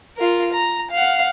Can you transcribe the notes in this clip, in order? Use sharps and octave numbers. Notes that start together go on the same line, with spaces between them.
F4 A#4
A#5
F5 F#5